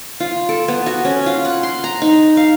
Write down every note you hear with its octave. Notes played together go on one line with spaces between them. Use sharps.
F4
A4
B3
F#4
C#4
F4
F#5
C6
A#5
D#4
F5